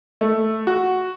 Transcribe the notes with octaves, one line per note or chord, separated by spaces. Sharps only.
A3
F#4